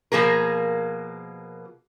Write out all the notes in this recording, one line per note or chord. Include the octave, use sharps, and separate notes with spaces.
B2 F3 A#3 G#4 A#4